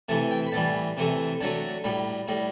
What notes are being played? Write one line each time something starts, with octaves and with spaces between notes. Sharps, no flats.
C3 E3 A3 A5
G5
B5
A2 E3 G3 A5
C3 E3 A3
D3 F#3 A3 A5
A2 G3 B5
A2 G3